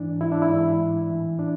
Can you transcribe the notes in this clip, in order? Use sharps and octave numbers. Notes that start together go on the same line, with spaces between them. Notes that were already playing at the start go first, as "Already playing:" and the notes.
Already playing: G#2 E3 D4
E4
D4
E4
G#2 E3
A2 E3
D4